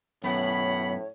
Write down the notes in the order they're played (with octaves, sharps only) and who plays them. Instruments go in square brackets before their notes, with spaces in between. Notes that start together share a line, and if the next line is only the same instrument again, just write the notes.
[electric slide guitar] F#2 B3 [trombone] A2 [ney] C#5 [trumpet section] F#5 B5